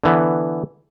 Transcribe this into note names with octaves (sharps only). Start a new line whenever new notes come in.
D3 E3 B3